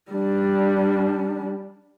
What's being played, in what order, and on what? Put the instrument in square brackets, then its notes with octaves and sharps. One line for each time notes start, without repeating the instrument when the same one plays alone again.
[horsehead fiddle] G3 D4